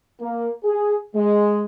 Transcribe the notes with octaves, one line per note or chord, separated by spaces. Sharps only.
A#3
G#4
G#3